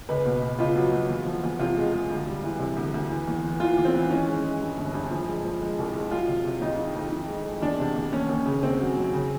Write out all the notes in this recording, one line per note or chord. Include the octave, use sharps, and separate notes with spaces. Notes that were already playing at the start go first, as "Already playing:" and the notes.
C#2 B4
B2
B2
C#2 F4
F#3
F#3
E2
F3
E2
C3 F4
G#3
G#3
D2
G3
E3
C3
D2
D2
E3
E2
E3
E3 F4
E2
C4
E3
D#3 C#4
G#3
G#3
G2
G1
G2
F3
G#3
F3
G#3
C2
G#3
F#3 F4
C3
C3
F2 D#4
D#3
F2
D#3
G#3
G#3
E2 D4
C3
E2
D#2 C#4
D#2
C#3
D#2 C4
F#3
F#3
C#3